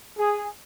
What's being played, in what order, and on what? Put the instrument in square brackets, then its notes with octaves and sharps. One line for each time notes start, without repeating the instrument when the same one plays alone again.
[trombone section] G#4